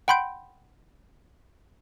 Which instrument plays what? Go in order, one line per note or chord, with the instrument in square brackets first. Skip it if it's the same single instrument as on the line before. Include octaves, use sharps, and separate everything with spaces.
[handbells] F#5 G5 B5 C6 G6 D7